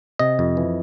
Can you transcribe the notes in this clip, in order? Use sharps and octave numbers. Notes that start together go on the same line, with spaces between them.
C3 D#5
F2
E3